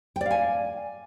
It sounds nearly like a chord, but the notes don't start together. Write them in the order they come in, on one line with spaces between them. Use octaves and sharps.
G5 D5 F5 G#5